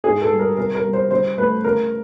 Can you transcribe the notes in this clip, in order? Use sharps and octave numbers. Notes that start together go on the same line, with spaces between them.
G#2 G#4
A4
G3
A#4
C3 A#4
A#4
G3
C5
C#3 C5
A3 B4
C#3 A#4